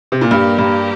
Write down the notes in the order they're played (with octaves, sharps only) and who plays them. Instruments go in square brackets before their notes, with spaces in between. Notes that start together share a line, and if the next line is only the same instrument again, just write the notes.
[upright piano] C3
A#2
[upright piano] G2 [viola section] A#3 G4 A#4
[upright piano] G2